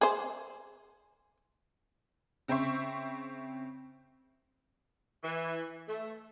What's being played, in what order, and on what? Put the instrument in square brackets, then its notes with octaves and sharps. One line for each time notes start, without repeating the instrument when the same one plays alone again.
[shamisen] G#4 C5
[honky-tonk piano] C#3 C4 C5 E5 C#6
[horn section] E3
A3